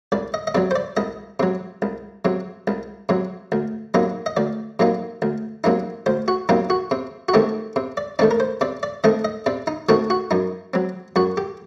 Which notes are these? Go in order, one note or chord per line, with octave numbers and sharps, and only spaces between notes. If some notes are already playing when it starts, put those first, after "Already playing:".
C2 D5
D#5
D#5
C3 F#3 D5
C5
D5
C2 D#5
C3 F#3
C2
C3 F#3
C2
C3 F#3
D2
C3 F#3 A#3 D#4
D#5
D2 D5
C3 F#3 A#3 D#4
D2
C3 F#3 A#3 D#4
D2 C5
F#4
C3 F#3 A#3 D#4 G4
F#4
C3
F#4
D#3 A3 C4 D#4 G4
C3
D5
D#3 A3 C4 D#4 D5
A#4
C5
C3 D5
D5
D#3 A3 C4 D#4 D#5
D#5
C3 D5
D#4
D#3 A3 C4 D#4 F#4
F#4
F#2 D#4
F#3 C4
F#2 F#4
G4